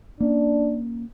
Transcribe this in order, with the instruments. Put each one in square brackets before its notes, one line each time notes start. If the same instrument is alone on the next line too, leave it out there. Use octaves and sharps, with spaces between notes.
[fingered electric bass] A#3 C#4 [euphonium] D4